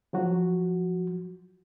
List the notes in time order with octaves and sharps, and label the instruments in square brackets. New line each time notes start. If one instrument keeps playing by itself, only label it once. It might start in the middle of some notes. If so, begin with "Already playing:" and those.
[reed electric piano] F3 F#3 F#4